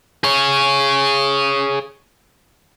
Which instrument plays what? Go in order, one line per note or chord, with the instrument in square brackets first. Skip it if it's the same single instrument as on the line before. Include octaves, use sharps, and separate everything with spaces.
[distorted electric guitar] G#4 C#5